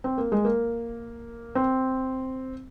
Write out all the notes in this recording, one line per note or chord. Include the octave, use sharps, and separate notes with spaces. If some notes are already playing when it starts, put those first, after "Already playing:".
C4
A#3
G#3
A#3
C4